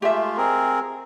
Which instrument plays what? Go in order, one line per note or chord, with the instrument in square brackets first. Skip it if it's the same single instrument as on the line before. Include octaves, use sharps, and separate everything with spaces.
[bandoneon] G#3 A3 F4 [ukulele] G4 E5
[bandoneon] C4 G#4 A#4